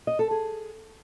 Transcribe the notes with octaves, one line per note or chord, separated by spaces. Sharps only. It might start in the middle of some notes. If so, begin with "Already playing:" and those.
D#5
A4
G#4